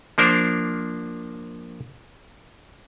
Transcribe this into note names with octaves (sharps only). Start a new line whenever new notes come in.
F3 A#3 D4 A#4 C5